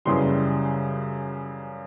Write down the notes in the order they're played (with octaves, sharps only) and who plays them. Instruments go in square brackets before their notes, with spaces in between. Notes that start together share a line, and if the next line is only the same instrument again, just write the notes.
[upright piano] F#2 C#3 E3 G3 C6